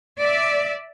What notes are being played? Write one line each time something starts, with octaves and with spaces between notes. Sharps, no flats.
D5 E5